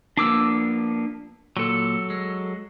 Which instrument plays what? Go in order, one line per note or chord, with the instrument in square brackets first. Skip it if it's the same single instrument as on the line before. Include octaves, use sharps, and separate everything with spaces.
[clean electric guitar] F3 A#3 B3 [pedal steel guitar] D4 D6 E6
[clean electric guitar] A#2 [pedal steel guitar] F#3 A4
[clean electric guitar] G#3